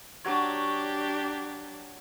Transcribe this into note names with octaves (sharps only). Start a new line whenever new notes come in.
F#3 D4 F#4 G4 C#5